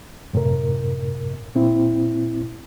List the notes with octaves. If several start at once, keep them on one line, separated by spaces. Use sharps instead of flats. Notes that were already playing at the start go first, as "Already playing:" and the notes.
F#2 A2 C3 A#4
A#2 C4 E4